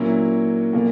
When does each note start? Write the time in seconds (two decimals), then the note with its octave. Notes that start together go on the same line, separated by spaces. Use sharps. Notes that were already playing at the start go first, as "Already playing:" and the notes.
Already playing: A#2 F#3 A#3 C#4 E4
0.73 A#2 F3 A#3